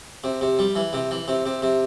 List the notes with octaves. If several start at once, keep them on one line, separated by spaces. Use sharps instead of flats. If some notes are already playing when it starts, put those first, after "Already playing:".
C3
C3
G3
E3
C3
E3
C3
C3
C3